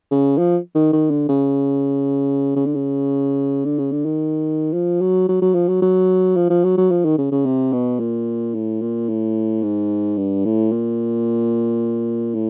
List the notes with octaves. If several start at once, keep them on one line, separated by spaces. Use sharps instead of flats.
C#3
F3
D#3
D#3
D3
C#3
C#3
D3
C#3
D3
C#3
D3
D#3
F3
F#3
F#3
F#3
F3
F#3
F#3
F3
F3
F#3
F#3
F3
D#3
C#3
C#3
C3
B2
A#2
A2
A#2
A2
G#2
G2
A2
A#2
A2